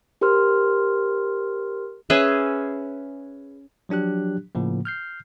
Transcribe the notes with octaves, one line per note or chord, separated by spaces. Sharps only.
G4 A#4 C5 C6 F6
C#4 G#4 B4 E5
F3 F#3 D4 G4 F#6
A2 C#3 F3 A#3
F6 G6 C7